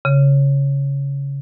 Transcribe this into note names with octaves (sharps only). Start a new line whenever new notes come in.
C#3